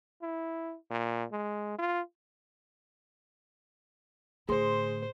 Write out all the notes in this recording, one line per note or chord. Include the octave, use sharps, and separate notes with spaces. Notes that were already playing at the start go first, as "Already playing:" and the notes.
E4
A#2
G#3
F4
A2 D3 G#4 C5 C6